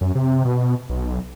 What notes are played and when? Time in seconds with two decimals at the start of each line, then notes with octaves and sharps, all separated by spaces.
0.01 F#2
0.15 C3
0.45 B2
0.90 B1